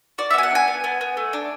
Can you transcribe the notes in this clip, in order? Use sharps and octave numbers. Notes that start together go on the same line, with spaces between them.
F#4 D5
E5
B3 G#5
F#5
D4 G#5
B3
B3
B3
A3
D4